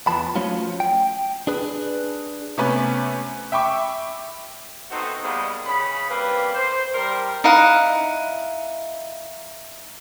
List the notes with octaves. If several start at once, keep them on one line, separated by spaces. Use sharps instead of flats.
E2 F3 B3 A5 B5
F3 F#3 A3 C#4 F4
G5
D4 G#4 B4
C3 A3 B3 C#4 B4
E5 G5 B5 C#6 D6
A3 B3 C4 D#4 F#4 C5
D#3 G3 G#3 A#3 B3
C#3 B5
C#3 G3 A#3 C4 B4
C5
G3 A#4 C6
D#4 E4 F5 F#5